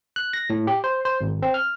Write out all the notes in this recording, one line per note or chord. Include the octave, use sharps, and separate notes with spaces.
F#6
A#6
A2
G4
C5
C5
G#1
C4
F6